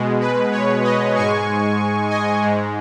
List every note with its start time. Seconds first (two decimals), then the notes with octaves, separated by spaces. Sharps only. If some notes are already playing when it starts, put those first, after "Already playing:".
Already playing: B2 G#3
0.21 B4
0.52 C#5
0.84 B4 D#5
1.15 G#2 G#3 G#5 C#6
2.10 D#5 G#5
2.42 G#2 G#3